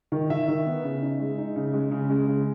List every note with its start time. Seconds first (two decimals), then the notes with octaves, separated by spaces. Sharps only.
0.12 D#3
0.30 D#3 E5
0.48 D#3
0.66 B3
0.84 C#3
1.02 D#4
1.20 G#3
1.38 D#4
1.56 C#3
1.74 G#3
1.91 C#3
2.10 G#3
2.28 C#3